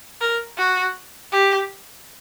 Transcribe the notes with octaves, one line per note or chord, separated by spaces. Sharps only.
A#4
F#4
G4